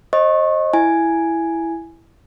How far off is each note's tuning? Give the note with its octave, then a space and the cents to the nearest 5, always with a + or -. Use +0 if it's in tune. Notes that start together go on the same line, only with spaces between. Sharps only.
C5 +35 D#5 +0 C#6 -30
E4 +5 G#5 +0